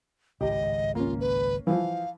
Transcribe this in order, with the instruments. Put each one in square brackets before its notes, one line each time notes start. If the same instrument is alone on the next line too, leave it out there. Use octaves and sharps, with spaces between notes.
[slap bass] G#1 C#2 A2 [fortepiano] G4 [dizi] D#5
[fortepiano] A#3 C#4 [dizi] F4
[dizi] B4
[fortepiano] E3 F3 [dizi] F5